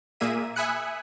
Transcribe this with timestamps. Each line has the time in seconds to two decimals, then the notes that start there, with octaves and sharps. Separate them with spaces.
0.20 A#2 A#3 G#4 E5 D#7
0.56 E5 G#5 B5 D#6 F#6 C#7